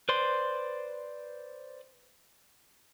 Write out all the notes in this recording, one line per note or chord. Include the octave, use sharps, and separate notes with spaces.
B4 C5 D5 C6